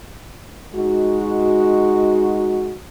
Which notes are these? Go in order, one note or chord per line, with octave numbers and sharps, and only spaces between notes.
G#3 D#4 F#4